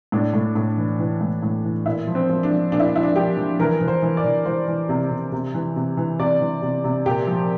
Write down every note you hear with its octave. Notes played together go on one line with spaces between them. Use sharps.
A2 D4
A2
A2
E3
E3
A2
A2
E3
A#2 E4
F3
C4
F3
D4
F3
A#2 D4
E4
D4
F3 E4
D4
F3 G4
F3
E3 A#4
E3
C5
E3
D5
E3
E3 C5
E3
C3
C3
C3
E3
C3
E3
C3 D5
E3
C3
C3
A#2 G4
F3